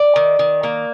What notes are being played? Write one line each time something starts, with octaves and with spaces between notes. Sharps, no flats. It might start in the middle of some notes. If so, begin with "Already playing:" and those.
Already playing: D5
D#3
D#3
A#3